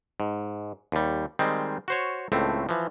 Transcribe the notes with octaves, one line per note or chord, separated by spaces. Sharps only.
G#2
D#2 G3
D#3 G3 G#3 C4
F#4 C5 C#5
C#2 A2 A3 C4
E3 F3